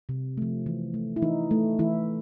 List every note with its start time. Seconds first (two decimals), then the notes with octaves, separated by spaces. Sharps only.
0.09 C3
0.37 F3 A3
0.66 E3
0.94 A3
1.16 E4
1.22 E3 D#4
1.51 A3
1.79 E3 E4